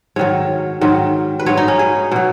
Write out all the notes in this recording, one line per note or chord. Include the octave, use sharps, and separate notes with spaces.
G#2 D#3 F#3 C#5
G#2 D#3 F#3
B4
G#2 F#3 C#5
D#4
C#4
G#4
B2 F#3